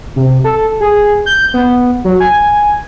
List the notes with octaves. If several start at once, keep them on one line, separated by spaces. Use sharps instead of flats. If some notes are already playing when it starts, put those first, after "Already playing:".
C3
A4
G#4
G6
B3
F#3
G#5